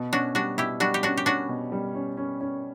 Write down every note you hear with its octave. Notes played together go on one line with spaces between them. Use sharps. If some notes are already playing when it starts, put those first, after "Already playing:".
Already playing: B2
C#4 D4 F#4
G3 D4 F#4
B2 E4 G4
G3 D4 F#4
G4
C#4 D4 F#4
G4
C#4 D4 F#4
B2
G3
C#4
C#4
C#4